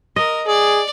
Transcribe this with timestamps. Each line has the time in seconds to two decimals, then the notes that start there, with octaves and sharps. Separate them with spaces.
0.16 A#4 D#5
0.47 G#4 D5